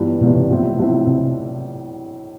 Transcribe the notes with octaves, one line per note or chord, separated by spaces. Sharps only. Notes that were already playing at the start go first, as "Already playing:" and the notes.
Already playing: G1 G2 E3 B3
G1 G2 B2 E3 B3
C3
B1 A2 F3 C4 E4
B1 A2 F3 C4 E4
C3